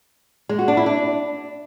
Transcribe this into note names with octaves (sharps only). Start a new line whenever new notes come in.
G#3
F#4
D4
E4
D4